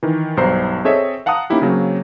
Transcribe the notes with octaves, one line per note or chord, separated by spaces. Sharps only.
D#3 E3
B1 G2 C5 A#5 C7
C4 G#4 A4 C#5 D#5 E5
F5 F#5 A5 A#5 D#6 F#6
A#3 C#4 D#4 E4 G4
C#3 F#3 A#3 C4